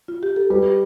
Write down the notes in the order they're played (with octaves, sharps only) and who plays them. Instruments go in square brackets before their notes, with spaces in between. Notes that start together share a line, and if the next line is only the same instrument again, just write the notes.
[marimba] F4
G4
A4
[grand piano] G3 [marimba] B4